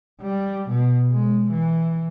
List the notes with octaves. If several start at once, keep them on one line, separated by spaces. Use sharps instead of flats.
G3
B2
G#3
E3